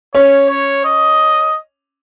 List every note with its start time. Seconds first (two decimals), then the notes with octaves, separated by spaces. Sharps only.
0.15 C#4 C#5
0.49 C#5
0.85 D#5